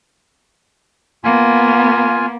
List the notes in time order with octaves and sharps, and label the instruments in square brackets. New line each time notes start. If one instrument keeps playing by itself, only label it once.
[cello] A#3 B3 [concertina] F4 G#5